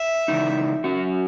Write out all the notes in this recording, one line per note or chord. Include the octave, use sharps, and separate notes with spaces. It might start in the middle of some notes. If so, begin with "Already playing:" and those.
Already playing: E5
C#3 E3 G#3 D#4
F#3 C#4 F#4